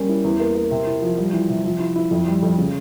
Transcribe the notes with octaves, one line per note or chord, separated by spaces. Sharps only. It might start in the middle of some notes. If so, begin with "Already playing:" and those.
Already playing: G3 A#3 C#4
E4
E2
A#3
A#3
C3
E4
F3
G3
E3
C3
F3
E4
E4
F2
G3
F2
C#3